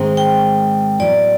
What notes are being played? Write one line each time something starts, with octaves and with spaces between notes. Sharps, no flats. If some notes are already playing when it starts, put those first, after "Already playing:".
Already playing: G#2 D#3 G#3 C4
G5
A2 F#3 B3 D5